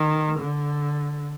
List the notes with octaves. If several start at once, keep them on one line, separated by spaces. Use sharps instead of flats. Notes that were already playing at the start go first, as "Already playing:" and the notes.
Already playing: D#3
D3